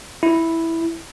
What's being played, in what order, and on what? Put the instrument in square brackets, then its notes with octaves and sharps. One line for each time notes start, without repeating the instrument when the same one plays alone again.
[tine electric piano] E4